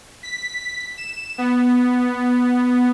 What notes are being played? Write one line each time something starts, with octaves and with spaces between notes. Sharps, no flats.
B6
E7
B3